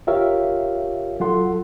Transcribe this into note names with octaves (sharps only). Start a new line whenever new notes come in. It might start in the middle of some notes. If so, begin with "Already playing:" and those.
F4 G4 A#4 C#5 E5 F5
F#3 F4 A4 F#5 C6